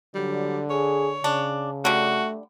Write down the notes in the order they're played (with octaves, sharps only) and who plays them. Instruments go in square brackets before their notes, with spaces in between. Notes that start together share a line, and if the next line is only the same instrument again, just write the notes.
[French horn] D3 [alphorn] F#3 [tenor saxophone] G3
[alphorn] G#4 [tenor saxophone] C#5
[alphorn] C#3 [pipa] D4
[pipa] D3 G3 [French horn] A3 [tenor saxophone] F#4